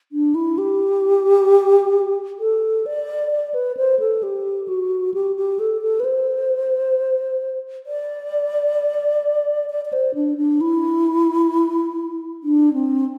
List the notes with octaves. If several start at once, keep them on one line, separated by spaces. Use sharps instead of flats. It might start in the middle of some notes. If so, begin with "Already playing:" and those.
D4
E4
G4
A4
D5
D5
B4
C5
A4
G4
F#4
G4
G4
A4
A4
B4
C5
D5
D5
D5
C5
D4
D4
E4
D4
C4